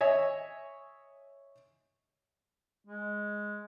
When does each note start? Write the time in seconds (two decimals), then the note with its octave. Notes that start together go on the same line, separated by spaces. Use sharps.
0.01 C#5 D#5 E5 G#5
2.85 G#3